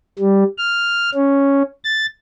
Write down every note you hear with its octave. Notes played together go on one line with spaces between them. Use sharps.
G3
F6
C#4
A6